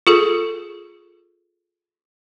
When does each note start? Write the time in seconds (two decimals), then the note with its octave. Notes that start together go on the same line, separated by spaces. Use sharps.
0.07 F4 G#4 A4